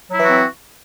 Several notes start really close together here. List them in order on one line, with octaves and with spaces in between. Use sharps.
F#3 E4 E3 F#4 C4